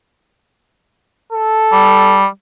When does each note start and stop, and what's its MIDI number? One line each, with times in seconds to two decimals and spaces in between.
1.32 2.23 69
1.73 2.26 55